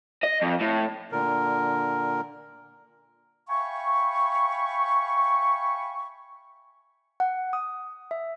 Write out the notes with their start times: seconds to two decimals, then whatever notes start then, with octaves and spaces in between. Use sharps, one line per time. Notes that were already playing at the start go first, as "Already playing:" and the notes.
0.24 D#5
0.42 F2
0.61 A2
1.12 A#2 D3 A#4
3.48 E5 F5 G5 G#5 B5 C#6
7.20 F#5
7.53 D#6
8.11 E5